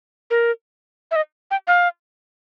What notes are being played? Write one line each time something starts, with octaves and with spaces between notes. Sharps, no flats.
A#4
E5
D#5
G5
F5